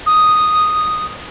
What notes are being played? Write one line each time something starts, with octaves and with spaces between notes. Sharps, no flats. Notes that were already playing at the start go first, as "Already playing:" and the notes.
D#6